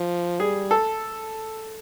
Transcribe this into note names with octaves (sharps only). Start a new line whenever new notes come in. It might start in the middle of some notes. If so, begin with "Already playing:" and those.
Already playing: F3
G3 G#4
A4